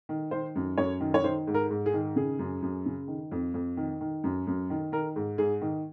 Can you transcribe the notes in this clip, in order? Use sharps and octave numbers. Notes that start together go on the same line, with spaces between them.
D#3
D#3 C5
F#2
F#2 C#5
D#3
C#5
D#3 C5
G#2
A#4
G#2
G#4
D#3
C#3 G#4
F#2
F#2
C#3
D#3
F2
F2
D#3
D#3
F#2
F#2
D#3
D#3 A#4
G#2
G#2 G#4
D#3